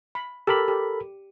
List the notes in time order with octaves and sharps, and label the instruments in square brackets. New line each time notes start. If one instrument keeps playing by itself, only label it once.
[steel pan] B5
[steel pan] G4 [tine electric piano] A4 A#4 B5
[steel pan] G4